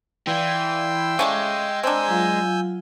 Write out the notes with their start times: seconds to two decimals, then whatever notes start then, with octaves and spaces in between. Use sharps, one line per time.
0.27 E3 D5 F5 G5 C6 E6
1.19 C#3 G#3 A3 G4
1.83 C4 D4 G#5 A#5 E6 G6
2.08 F#3 F4 F5